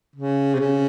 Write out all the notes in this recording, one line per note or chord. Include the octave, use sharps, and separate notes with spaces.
C#3
C3
C#3